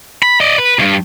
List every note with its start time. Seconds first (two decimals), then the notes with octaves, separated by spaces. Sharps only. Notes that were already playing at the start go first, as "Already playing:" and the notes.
0.23 B5
0.40 D5 D#5
0.58 B4
0.79 C#2 G2